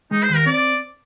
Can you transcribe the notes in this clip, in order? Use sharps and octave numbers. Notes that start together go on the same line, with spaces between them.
G#3 D#4
C5
D#2
A#4
C4 D5